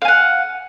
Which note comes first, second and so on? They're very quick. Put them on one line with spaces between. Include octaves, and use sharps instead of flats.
F5 G#5 F#5